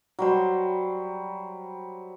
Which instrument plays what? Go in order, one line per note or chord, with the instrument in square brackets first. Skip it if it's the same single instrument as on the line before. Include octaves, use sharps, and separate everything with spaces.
[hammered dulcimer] F#3 G3 C5